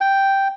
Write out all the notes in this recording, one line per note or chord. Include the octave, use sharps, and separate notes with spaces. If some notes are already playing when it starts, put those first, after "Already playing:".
G5